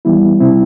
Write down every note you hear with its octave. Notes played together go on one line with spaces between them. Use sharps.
E3 G3 B3 E4
C3 G3 C4 E4